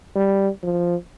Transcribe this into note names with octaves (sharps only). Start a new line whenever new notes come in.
G3
F3